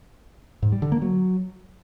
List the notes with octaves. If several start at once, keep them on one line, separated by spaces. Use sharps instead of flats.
G#2
G3
D3
A#3
F#3